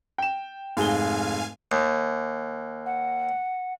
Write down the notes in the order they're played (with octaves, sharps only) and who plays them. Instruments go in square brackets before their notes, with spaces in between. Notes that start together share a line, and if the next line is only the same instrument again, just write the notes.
[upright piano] G5 E7
[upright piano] F1 G#4 G7 [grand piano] G#2 [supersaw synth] F5 G#5
[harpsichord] D#2
[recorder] F#5